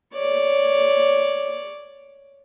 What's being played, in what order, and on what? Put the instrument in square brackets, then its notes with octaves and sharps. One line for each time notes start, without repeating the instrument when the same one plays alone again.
[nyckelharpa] C#5 D5